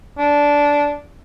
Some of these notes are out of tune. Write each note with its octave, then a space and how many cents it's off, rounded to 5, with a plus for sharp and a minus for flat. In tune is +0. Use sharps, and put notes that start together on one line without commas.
D4 -15